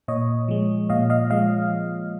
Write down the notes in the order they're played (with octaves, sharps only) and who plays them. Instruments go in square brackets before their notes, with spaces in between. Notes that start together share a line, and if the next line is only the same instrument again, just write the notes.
[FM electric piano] A#2 C#5 D#5
F3 G#3
A#2 D#5 F5
D#5 F5
F3 G#3 D#5 F5